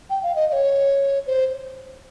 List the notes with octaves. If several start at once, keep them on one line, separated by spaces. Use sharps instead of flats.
G5
F5
D#5
D#5
C#5
C5